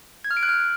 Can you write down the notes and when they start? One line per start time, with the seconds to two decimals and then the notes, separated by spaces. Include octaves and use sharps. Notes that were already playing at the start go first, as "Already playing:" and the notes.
0.24 G#6
0.31 F6
0.37 D7
0.43 F#6
0.49 F6